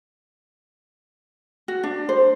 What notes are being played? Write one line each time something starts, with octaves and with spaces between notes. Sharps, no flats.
F#4
D4
C5